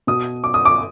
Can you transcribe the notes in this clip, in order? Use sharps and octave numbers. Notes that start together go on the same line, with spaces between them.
B2 D#6
D6
D#6
D6